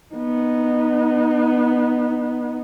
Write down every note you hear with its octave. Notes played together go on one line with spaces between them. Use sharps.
B3 D#4